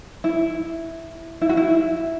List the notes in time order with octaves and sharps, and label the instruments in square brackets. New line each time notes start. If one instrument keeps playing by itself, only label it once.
[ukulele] E4
E4
F#4
E4